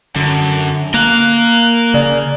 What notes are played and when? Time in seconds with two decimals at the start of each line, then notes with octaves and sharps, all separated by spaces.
0.16 F#2 D3
0.94 A#3 A#4 F5 F#6
1.94 C#3 D5